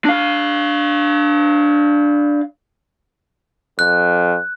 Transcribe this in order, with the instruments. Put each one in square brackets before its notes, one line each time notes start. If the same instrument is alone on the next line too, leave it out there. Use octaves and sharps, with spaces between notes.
[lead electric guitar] D4 F5
[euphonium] F2 [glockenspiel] F#6